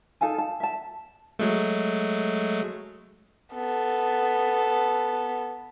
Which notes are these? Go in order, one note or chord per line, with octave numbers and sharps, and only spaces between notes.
D#4 A4 F5 G#5
A5
E5 A5
F#3 G#3 A3
B3 A4